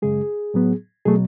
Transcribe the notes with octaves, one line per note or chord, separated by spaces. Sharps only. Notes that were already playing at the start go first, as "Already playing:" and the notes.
F#2 C#3 G#3 G#4
A2 F#3 B3
B2 F#3 A3 G#4